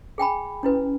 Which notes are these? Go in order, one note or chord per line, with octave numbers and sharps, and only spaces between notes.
G#4 G5 G#5 B5
C#4 E4 B4